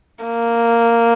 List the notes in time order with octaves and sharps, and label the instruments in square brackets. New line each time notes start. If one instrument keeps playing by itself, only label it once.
[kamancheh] A#3